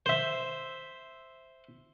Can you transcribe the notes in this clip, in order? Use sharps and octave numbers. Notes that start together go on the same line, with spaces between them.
C5 E5